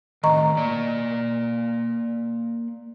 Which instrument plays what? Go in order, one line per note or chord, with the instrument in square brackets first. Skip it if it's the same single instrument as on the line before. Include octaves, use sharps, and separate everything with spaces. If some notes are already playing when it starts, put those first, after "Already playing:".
[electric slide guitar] A2 D#3 [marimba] D#5 A#5 C#6
[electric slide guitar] A#3 D5